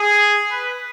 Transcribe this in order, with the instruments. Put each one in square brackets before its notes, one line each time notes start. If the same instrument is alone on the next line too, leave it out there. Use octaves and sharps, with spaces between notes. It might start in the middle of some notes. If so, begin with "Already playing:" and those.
Already playing: [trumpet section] G#4
B4